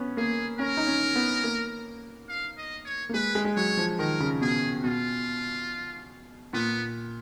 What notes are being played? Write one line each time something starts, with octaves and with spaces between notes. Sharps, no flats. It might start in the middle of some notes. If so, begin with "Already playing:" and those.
Already playing: B3 C#4
A#3 G#4
C#4 A#4
D#4
C#4
B3
A#3
F5
D#5
C#5
A#3
G#3 B4
G#3
G#3
F#3 C#5
F3
D#3 A#4
C#3
B2 G#4
B2 F4
A#2 B3